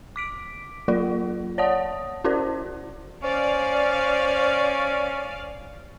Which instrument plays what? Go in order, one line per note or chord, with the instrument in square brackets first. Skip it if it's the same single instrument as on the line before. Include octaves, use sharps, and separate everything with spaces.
[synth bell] D6 B6 D7
F#3 A#3 F4 A#4 D5
C#5 D5 F#5 A5 D#6
C#4 E4 F#4 A#4 C5 D5
[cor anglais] C#4 [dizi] C5 [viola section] D5 F5